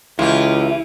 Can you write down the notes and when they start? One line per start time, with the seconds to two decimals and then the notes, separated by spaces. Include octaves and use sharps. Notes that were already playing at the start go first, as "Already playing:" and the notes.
0.19 C#2 E3 E4 F4 G4